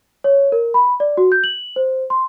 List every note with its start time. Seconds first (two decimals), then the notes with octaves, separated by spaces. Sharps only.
0.24 C#5
0.52 A#4
0.74 B5
1.00 D5
1.17 F#4
1.32 G6
1.44 F#7
1.76 C5
2.10 C6